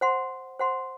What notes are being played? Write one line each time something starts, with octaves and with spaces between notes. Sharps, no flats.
C5 F#5 C6
C5 F#5 C6